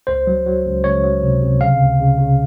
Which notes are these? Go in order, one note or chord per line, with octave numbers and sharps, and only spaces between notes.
C#2 C5
F#3
F#3
C#2
C#2 C#5
F#3
C3
C3
C#3 F5
C#2
C#3
C#3